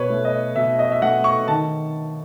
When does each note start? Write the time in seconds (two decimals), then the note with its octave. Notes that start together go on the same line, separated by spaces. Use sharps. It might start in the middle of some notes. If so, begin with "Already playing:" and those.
Already playing: B2 B4 C#5
0.10 A3
0.25 D#5
0.56 B2 E5
0.79 D#5
0.92 E5
1.02 A3 F#5
1.24 C#6
1.48 D#3 A5